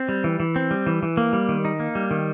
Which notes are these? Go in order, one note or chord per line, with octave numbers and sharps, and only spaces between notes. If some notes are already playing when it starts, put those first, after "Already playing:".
Already playing: C4
G3
E3
E3
C4
G3
E3
E3
A#3
G3
D#3
D#4
A#3
G3
D#3